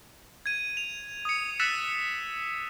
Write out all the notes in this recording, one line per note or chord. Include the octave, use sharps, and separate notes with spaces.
G#6 D#7
F7
D#6 C#7
E6 F#6 A6 B6 C#7 E7